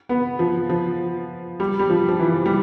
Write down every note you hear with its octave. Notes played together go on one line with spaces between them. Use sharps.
B3
F3
F3
G3
G3
F3
F3
E3
G3